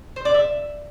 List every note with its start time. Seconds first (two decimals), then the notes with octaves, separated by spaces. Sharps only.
0.16 C5
0.25 D5
0.34 E5